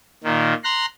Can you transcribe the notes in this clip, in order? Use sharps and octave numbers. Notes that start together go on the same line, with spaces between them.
A#2 D#3
A#5 C6 F#6